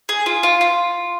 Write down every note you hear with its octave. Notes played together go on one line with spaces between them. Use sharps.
G#4
F4
F4
F4